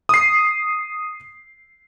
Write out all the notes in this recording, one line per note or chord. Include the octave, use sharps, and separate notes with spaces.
D#6 C7